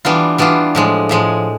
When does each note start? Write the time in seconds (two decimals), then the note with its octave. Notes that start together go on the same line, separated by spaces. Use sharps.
0.05 E3 G3 B3 D4 F4
0.38 E3 G3 B3 D4 F4
0.75 A2 F3 G#3
1.09 A2 F3 G#3